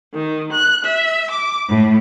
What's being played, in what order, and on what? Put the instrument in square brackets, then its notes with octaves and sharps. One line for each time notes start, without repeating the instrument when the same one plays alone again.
[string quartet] D#3
F#6
E5
D6
A2